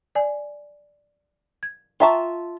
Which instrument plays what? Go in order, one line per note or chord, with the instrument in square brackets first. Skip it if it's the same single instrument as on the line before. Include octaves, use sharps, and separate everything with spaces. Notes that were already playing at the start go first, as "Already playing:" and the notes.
[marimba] D5 G#5
G#6
[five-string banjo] F4 E5 A5 [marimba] G5 A#5 C#6